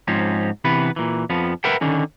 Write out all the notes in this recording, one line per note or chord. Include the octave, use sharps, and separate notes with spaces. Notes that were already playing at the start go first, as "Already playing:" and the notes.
G#2 F3 C4 C#4
C3 E3 B3 B4
A#2 E3
F2 F3 B3
A#4 B4 E5 F#5 G5
D3 D#3 C#4